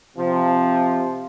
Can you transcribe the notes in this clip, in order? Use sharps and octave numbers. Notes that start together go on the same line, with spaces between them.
C3 F3